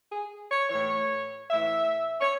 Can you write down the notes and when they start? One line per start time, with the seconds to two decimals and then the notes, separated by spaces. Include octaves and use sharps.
0.11 G#4
0.50 C#5
0.70 A2 E3 C#5
1.51 A2 E3 E5
2.21 C#5